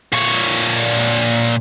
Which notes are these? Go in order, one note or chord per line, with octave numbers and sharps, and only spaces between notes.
A#2 C#5